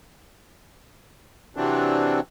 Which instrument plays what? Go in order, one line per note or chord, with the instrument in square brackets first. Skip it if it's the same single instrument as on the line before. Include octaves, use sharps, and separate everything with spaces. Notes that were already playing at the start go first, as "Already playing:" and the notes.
[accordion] C3 E3 F#3 C4 D4